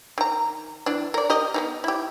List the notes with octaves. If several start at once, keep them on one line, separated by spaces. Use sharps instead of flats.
D#3 A#5
E3 D4
A#4 D5
G4 A#4 D#5
B3 C#4 D#4
E4 G4